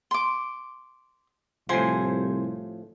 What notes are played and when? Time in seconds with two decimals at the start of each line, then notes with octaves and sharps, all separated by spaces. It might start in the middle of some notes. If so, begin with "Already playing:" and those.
0.11 C6 D6
1.69 C2 A2 F3 C5 G#5